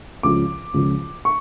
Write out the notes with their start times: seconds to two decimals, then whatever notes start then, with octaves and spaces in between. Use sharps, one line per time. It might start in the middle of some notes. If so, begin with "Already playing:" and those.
0.23 C#2 C#3 F3 D6
0.74 C#2 C#3 F3
1.25 C#6